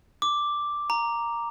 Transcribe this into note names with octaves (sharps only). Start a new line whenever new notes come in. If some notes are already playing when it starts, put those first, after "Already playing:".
D6
A#5